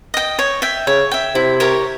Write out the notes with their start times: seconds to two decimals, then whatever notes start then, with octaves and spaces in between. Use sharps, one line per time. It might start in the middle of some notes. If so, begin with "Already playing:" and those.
0.14 D#5 G5
0.39 C#5
0.62 E5 G5
0.87 C#3 C#5
1.11 E5 G5
1.35 C3 E4
1.60 G4 A#4 C#5